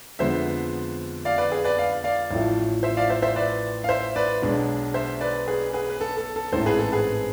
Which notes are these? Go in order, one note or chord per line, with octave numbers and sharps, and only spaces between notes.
F2 D3 G#3 B3 C5 E5
D5 F5
B4 D5
G#4
B4 D5
D5 F5
D5 F5
A1 A2 F3 A3
C5 E5
D5 F5
C5 E5
C5 E5
B4 D5
F5
C5 E5
B4 D5
B1 B2 G#3 D4
C5 E5
B4 D5
G#4 B4
G#4 B4
B4
A4
A4
A4
A1 G#2 E3 A3 C4 A4 C5
G#4 B4
A4
G#4 B4